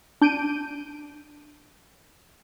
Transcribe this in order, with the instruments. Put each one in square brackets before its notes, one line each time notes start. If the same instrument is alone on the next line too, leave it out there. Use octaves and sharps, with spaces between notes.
[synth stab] D4 G6 D7 D#7